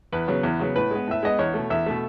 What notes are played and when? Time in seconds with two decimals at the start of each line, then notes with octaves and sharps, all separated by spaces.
0.12 E2 B4
0.28 C#3 F#3 B3
0.43 E2
0.59 C#3 F#3 B3
0.76 A2 B4
0.91 G#3 B3
1.08 A2 E5
1.23 G#3 B3 D#5
1.39 E2 C#5
1.54 B2 A3
1.70 E2 E5
1.86 B2 A3